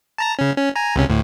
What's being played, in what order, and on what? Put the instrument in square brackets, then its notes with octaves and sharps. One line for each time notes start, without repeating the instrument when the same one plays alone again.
[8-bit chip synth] A5 A#5 A#6
C#3 C#4
C#4
G#5 A#5
C#2 C3 C#4
D2 A2